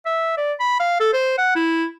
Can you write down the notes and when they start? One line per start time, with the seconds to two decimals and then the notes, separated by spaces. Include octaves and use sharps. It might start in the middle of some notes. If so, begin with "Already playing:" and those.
0.06 E5
0.37 D5
0.60 B5
0.80 F5
1.00 A4
1.13 C5
1.38 F#5
1.56 E4